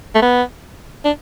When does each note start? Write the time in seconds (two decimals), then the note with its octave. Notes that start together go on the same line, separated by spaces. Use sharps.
0.15 A3
0.22 B3
1.05 D4